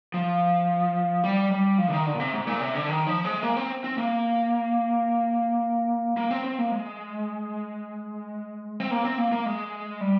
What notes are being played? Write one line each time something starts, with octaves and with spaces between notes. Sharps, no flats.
F3
G3
G3
F3
D3
D#3
D3
A#2
C3
G#2
A#2
C3
D3
D#3
F3
G#3
A#3
C4
C4
A#3
A#3
C4
C4
A#3
G#3
C4
A#3
C4
A#3
A#3
G#3
G3